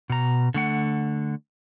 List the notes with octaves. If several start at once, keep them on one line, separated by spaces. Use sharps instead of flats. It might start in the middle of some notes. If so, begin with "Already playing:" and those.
B2 A#5
D3 A3 F#5